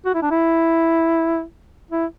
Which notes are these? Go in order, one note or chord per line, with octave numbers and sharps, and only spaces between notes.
F#4
E4
D4
E4
E4